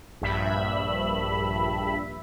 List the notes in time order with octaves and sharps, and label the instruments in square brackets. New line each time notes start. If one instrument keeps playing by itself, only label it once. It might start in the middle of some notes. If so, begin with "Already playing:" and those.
[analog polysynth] A#1 G2 E5 B5